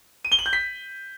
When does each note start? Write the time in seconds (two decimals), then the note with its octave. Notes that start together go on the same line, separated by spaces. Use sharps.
0.25 D#7
0.32 G7
0.39 F#7
0.46 G6
0.53 B6